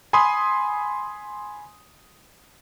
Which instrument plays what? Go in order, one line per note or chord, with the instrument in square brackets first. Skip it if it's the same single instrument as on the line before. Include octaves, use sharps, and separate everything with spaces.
[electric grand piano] G#5 B5 C6 D#6